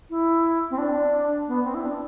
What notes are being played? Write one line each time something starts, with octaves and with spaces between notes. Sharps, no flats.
E4
C4
D4
B3
C4
E4
D4